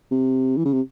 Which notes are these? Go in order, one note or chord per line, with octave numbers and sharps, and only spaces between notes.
C3
E3
C#3
C3